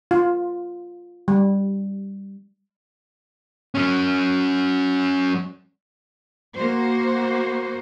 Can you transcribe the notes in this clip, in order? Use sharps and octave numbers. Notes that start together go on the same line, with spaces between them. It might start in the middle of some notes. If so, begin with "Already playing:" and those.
F4
G3
F#3 C#4
A#3 F#4 C5